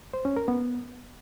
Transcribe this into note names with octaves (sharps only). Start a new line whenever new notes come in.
C5
C#4
A#4
B3